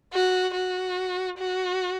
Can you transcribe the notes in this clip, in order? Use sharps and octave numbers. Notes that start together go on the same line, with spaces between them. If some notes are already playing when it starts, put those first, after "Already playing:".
F#4
F#4
F#4